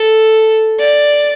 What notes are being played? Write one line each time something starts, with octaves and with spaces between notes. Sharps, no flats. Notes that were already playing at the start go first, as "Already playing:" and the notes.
Already playing: A4
D5